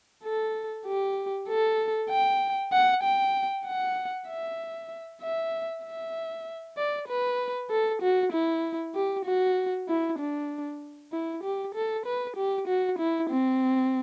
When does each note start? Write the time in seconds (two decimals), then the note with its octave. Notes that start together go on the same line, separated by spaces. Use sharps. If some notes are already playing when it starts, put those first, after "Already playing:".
0.24 A4
0.86 G4
1.49 A4
2.10 G5
2.73 F#5
3.04 G5
3.66 F#5
4.28 E5
5.22 E5
5.84 E5
6.78 D5
7.08 B4
7.71 A4
8.02 F#4
8.33 E4
8.95 G4
9.26 F#4
9.89 E4
10.19 D4
11.13 E4
11.44 G4
11.75 A4
12.06 B4
12.37 G4
12.68 F#4
12.99 E4
13.30 C4